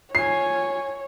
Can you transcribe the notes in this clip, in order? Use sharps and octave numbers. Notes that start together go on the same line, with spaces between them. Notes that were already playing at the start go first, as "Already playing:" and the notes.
F4 C#5 G#5 C7